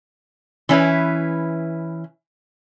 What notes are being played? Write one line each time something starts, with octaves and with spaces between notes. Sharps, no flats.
E3 C#4 E4 B4